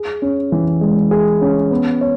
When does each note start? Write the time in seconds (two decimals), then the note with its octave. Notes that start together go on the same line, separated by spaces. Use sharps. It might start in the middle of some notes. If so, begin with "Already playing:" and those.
Already playing: G#4
0.22 C#4
0.52 E3
0.81 G#3
1.11 G#4
1.41 C#4
1.71 B3
2.01 C#5